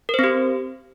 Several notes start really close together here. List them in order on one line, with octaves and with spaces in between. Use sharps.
A#4 C5 C4 G4